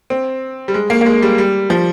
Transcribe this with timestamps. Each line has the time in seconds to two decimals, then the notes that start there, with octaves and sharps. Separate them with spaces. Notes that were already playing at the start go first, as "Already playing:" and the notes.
0.10 C4
0.68 G3
0.74 G#3
0.90 A#3
1.01 A#3
1.06 G#3
1.22 G3
1.38 G3
1.70 F3